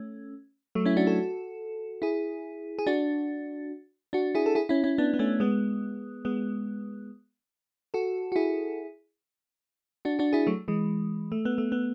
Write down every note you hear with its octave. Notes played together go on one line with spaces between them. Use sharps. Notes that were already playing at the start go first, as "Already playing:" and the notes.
Already playing: A3 C#4
F#3 A3
C#4 E4
D4 F#4
F#4 A4
E4 G#4
G#4
D4 F#4
D4 F#4
E4 G#4
A4
E4 G#4
C#4 E4
C#4 E4
B3 D4
B3
A3 C#4
G#3 B3
G#3 B3
F#4 A4
F#4
E4 G#4
D4 F#4
D4 F#4
E4 G#4
F#3 A3
E3 G#3
A3
B3
A3
B3